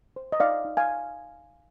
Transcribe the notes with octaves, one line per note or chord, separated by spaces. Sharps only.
C5
D#5
D#4 D5 F5
D#4
F5 G#5